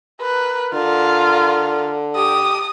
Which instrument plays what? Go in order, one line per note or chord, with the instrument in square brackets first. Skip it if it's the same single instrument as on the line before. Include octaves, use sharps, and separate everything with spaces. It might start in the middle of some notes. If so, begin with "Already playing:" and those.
[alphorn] A#4 [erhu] B4
[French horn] D3 [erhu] F4
[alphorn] G4 [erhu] D#6